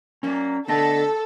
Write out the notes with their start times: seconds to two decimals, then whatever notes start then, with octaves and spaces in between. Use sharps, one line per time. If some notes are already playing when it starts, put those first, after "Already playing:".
0.23 F#3 A#3 C#4 D5
0.68 D3 A3 B3 A4 D#5 A5